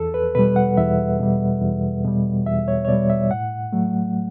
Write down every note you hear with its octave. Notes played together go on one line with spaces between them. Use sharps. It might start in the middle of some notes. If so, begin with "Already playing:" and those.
Already playing: E2 A4
B4
B2 G3 B4
F#5
E2 E5
B2 G3
E2
B2 G3
E2 E5
C#5
C#5
B2 G3 D5
E5
A2 F#5
F#3 A3